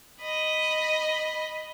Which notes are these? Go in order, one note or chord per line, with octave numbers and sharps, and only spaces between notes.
D#5 B5